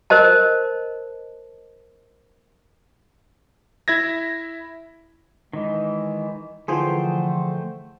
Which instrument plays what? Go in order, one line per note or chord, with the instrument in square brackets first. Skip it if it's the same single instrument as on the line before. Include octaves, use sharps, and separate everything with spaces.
[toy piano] A#4 C5 D#5 A5
[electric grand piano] E4 E5 G#6 A#6
[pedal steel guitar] D#3 E3 [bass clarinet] G#3
[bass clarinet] D3 [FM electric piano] E3 F3 G#4 [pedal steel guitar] A3 C5 G5